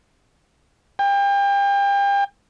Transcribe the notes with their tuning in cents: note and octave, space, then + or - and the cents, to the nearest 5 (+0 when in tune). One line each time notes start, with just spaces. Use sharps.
G5 +35